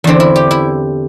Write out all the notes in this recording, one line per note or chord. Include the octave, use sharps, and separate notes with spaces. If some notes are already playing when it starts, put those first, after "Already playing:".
E2 D3 C4
E4
G4
E4